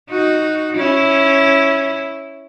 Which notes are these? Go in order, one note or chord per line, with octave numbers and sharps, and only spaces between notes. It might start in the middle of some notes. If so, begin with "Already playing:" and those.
D#4 F#4
C#4 E4